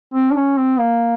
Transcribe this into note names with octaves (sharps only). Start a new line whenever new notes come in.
C4
D4
C#4
C4
A#3